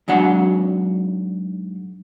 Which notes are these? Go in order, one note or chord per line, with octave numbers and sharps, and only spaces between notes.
G#2 F#3 D4 F#5